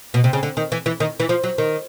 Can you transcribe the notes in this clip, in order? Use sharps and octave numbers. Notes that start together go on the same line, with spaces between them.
B2
C3
C#3
D3
D#3
E3
E3
D#3
E3
F3
F#3
D#3